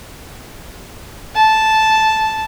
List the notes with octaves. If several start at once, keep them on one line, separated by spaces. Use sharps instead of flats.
A5